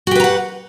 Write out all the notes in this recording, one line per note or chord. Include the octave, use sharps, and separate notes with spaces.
F#4 G4 B4 F#5 A#5